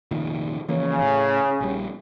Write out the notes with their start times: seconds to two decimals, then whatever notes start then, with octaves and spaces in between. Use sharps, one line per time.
0.11 F1 A#2 D#3
0.69 C#3 E3 F3 A#3
1.01 A2
1.61 A#1 G3